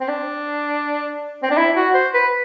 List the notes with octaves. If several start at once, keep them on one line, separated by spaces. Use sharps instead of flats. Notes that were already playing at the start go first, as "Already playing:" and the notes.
C4
D4
C4
D4
E4
F#4
C5
B4